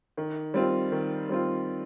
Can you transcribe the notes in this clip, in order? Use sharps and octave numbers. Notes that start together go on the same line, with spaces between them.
D#3
G3 C4 F4
D#3
G3 C4 F4